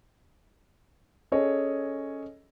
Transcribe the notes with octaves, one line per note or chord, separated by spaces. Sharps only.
C#4 G#4 A4 C#5 D#5